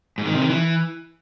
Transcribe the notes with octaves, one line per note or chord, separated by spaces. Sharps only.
G#2
D#3
C3
D#3
E3